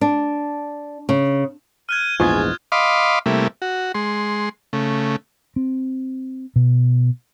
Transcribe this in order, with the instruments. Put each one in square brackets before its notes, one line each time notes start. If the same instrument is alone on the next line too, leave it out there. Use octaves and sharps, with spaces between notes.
[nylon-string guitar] D4
C#3
[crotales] F6 F#6 G#6 [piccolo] D#7
[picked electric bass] A#1 E2 G#2 [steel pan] F4 [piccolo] G#5 [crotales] C#6 D#6 A6
[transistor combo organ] D#5 F5 B5 C6 D6
C3 G3 A3 A#3 E4
F#4
G#3 C6
C#3 A3
[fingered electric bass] C4
B2